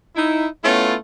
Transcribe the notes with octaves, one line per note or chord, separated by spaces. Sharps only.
D#4 E4
A3 B3 C#4 E4 F4